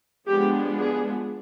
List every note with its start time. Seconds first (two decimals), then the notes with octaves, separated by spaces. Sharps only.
0.27 F3 G#3 B3 D4 G4
0.79 G#4